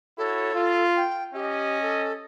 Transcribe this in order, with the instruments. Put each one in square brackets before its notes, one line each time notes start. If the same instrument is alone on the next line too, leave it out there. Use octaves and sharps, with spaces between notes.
[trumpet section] E4 F#4 C#5 [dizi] A4
[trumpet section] F4
[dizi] G5
[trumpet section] C#4 D#5 [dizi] G4
[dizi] A4